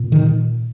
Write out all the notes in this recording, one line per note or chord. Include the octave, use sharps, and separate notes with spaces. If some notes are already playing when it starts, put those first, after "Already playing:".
Already playing: A#2
D#3